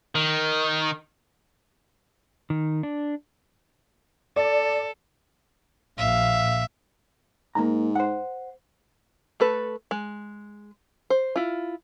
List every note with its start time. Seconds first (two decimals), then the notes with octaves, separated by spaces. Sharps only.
0.15 D#3
2.50 D#3
2.83 D4
4.36 A4 D5
5.98 A#1 E5 F5
7.55 G#2 A#3 A#5
7.96 C5 F#5
9.40 A3 A4 B4
9.91 G#3
11.10 C5
11.36 E4 F4